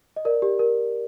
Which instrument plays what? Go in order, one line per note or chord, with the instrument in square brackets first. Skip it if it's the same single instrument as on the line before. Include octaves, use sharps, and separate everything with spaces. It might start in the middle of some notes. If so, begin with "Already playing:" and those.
[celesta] D#5
A#4 D5
G4
A#4